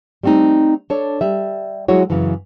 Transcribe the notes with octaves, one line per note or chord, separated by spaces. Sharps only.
G3 A3 C4 D4 D#4
D4 A4 C#5
G3 E5
F#3 G#3 E4 F#4 C#5
F#2 C#3 E3